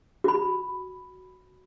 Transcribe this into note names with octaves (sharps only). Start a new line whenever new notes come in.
F#4 B5